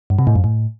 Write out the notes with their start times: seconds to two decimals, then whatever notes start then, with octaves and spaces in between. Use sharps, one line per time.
0.10 G2
0.19 C3
0.27 A2
0.35 F#2
0.44 A2